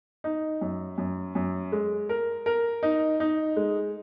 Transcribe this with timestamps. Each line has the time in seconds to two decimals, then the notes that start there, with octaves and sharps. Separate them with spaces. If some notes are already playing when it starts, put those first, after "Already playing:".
0.24 D#4
0.61 F#2
0.98 F#2
1.35 F#2
1.72 G#3
2.09 A#4
2.46 A#4
2.83 D#4
3.20 D#4
3.56 G#3